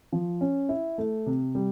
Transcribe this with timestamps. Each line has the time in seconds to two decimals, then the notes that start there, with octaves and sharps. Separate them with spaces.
0.12 F3
0.41 C#4
0.69 E4
0.98 A3
1.26 C3
1.55 G3